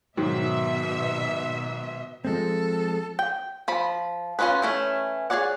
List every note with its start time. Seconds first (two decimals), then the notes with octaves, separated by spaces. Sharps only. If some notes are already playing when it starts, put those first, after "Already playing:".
0.17 G#2 B2 D#3 F#3 E5
2.25 F3 G#3 C4 A4
3.19 G5
3.68 F3 B5
4.39 C#4 D#4 F4 F#4 B4
4.62 E3 A3 C#4
5.30 G#4 A4 C#5 D5 F#5